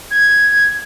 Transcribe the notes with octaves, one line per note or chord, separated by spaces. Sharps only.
G#6